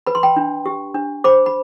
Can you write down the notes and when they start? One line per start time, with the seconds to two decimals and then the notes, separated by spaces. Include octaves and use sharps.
0.07 B4 B5
0.15 C6
0.23 G5 B5
0.36 D4
0.66 G4
0.95 D4
1.24 C5 B5 D6
1.46 B5